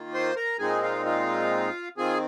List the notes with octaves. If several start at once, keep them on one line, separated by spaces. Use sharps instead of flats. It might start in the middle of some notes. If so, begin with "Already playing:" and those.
Already playing: D#3 A#3 F4
C5 C6
A#4 A#5
A#2 G#3 C4 D#4 G#4 G#5
F4 F5
F4 F5
D#3 C4 F4 G#4 G#5